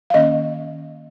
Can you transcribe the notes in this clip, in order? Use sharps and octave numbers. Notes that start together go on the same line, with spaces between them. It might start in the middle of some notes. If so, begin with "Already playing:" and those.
F5
D#3 A#3 C#4 D#5